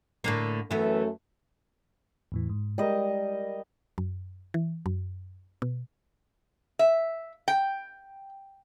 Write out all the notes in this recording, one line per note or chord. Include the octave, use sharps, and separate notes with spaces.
A2 D3 A#3
F#2 E3 A3 B3
E2 A2 E3
G#2
G3 G#3 A#4 D#5
F#2
E3
F#2
B2
E5
G5